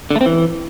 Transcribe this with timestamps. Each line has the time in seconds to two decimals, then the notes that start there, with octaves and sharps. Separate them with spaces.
0.11 D3
0.16 A3
0.21 C4
0.26 E3